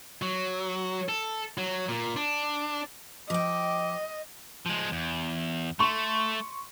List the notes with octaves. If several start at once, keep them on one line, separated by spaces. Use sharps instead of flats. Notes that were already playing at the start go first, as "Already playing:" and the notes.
F#3
A4
F#3
A#2
D4
F3 D#5 G5 D6
F3 G#3
E2
A3 C6 C#6